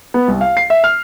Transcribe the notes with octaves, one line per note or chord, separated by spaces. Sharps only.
B3
C2
F5
C7
E5
F6